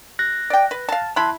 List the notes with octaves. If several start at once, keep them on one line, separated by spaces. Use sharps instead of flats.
F#6 A#6
D5 G5
B4
F5 A5
E4 A5 B5 C6 F#6